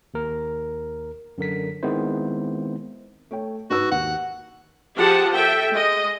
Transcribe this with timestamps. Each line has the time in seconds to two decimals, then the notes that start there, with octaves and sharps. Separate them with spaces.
0.14 D#2 A#4
1.38 F#2 D3 A#4 B6
1.83 D#3 G#3 B3 C4 E4 C5
3.31 A3 C#5 G5
3.70 G#2 F#4 B4 E6
3.92 D#2 F#5
4.97 F3 G4 G#4 F#5 A5
5.34 A4 E5 G5
5.73 G#3 D#5